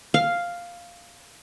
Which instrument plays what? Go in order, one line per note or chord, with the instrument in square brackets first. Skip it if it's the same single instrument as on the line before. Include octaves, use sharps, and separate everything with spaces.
[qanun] F5